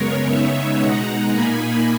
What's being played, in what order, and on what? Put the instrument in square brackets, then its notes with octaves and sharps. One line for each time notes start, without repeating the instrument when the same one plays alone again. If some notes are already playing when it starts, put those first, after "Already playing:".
Already playing: [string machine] F#2 C#3 G#3 B3 A#4 C#5
C#3 G#3 B3 D#4 C#5 E5
B2 G#3 D#4 F#5 A#5
A#2 A#3 D#4 G#5 B5